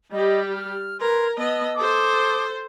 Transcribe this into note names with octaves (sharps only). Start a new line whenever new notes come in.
G3 G4 D#5 B5
F6
A#4 B4 C6 G#6
B3 D#5 A5 E6
A4 C5 A5 D6 D#6